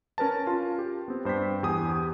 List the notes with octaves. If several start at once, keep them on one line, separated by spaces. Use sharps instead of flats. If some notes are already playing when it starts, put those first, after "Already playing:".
C#4 A#4 B4 A5
F4
G4
B3 C4
G2 C5 G5 B6
E2 G4 G#5 D#6